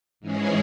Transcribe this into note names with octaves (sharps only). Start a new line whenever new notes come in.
G#2 E3 G#3 C#4 G#4